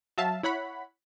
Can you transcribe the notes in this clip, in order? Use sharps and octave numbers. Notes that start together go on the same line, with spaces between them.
F#3 E5 F5 A5
E4 C#5 F#5 B5